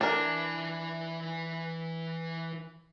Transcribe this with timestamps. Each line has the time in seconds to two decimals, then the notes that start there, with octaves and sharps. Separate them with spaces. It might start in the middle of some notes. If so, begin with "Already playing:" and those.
0.01 E3 D4 A#4 G#5